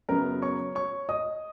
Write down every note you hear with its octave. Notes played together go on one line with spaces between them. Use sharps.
F#2 C#3 F#3 B3 A#4 A#5
C#5 C#6
C#5 C#6
D#5 D#6